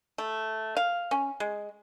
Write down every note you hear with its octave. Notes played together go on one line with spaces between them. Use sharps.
A3
F5
C#4
G#3